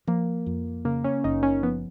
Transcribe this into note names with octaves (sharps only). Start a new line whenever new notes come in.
F3 A#3
F2
C#3 A#3
C#4
F#1 D#4
C#4
F3 B3